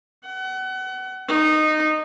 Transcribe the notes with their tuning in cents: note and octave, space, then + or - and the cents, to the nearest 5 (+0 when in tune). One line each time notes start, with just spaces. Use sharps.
F#5 +30
D#4 -15